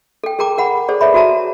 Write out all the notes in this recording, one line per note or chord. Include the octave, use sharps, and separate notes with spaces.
A4 G5
G#4 A#4 G5 A#5 D6
A#4 F#5 B5
G#4 A4 C5 D5
A4 B4 C#5 E5 B5
F#4 A4 E5 A5 A#5